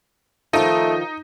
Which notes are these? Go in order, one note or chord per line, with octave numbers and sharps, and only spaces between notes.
D#3 F3 A3 D#4 F4